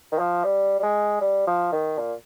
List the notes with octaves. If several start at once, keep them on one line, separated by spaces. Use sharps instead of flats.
D#3
F3
G3
G3
G#3
G3
F3
D#3
A#2